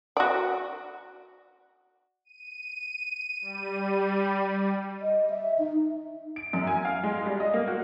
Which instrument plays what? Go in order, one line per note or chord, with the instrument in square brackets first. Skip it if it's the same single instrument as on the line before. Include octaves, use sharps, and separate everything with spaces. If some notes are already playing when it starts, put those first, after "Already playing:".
[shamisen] F#4 D5
[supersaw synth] D#7
G3
[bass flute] D#5
E5
D#4
[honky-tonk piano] D7
F#2
G#5
F5
G#3
G3
D#5
A#3
F#4